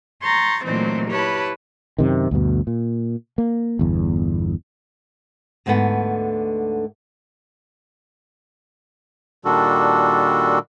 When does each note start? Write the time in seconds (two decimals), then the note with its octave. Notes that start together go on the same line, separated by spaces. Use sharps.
0.21 A#5 C6 C#6 G6 A6
0.64 A#2 E3 F#3 A3 C4 D#4
1.09 E4 G4 B4 C#5 A5 B5
1.98 F#2 C3 D#3
2.31 D2 G2 B2
2.67 A#2
3.38 A#3
3.79 G1 E2
5.66 D2 G#2 D3 A3 B3
9.45 A#2 D#3 G3 D4 F#4 A4